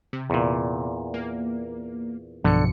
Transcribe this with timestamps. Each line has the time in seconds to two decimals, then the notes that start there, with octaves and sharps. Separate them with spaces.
0.13 C3
0.30 E2 A#2
1.14 A#3
2.44 B1 G2 B2 D3 F3 C#7